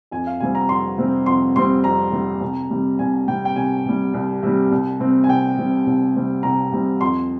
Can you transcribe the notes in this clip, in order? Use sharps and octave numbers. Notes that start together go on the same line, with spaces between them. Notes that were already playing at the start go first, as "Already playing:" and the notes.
F2 G#5
F5
C3 G3 C4 G#5
A#5
F2 C6
C3 G3 C4
F2 C6
C3 G3 C4 C6
F2 A#5
C3 G3 C4
C2
C3 G3
C2 G#5
C3 G3 G5
G5
C2 G#5
C3 G3
C2
C3 G3
C2
C3 G3 C4
G#5
C2 G5
C3 G3 C4
C2
C3 G3 C4
C2 A#5
C3 G3 C4
F2 C6